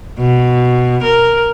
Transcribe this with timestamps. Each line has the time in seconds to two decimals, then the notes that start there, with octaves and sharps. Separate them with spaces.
0.19 B2
1.03 A#4